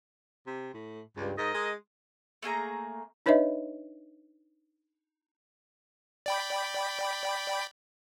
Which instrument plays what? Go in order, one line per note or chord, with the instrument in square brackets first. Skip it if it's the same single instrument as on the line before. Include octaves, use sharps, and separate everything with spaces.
[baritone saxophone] C3
A2
[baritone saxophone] C#2 [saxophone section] G2
[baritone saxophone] G#2 [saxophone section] A#4 D#5
[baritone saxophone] G#3
[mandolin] A3 A#3 G#4 A#5
[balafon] D4 D#4 B4 C#5 D#5 E5
[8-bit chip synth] D5 G5 B5